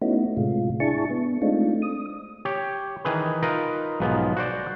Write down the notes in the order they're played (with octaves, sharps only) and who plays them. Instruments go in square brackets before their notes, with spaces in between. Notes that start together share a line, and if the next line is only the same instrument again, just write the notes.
[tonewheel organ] A3 B3 C#4 D#4 E4 F#4
A2 C3 G#3 F4
D4 E4 G#4 A5 C#6
B3
G#3 A3 C4 D4 D#4 F4
D#6
[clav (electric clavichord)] G4 C#5
D#3 E3 G#4 B4
D#4 F4 A#4 B4
B1 G#2 F3 B3
F#4 C5 D5